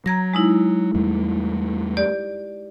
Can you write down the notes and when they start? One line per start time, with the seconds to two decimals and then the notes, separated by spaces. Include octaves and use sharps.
0.06 F#3 A#5 G#6 A#6
0.33 G#3 D#4 E4
0.94 E2 G3 A3
1.97 G4 D5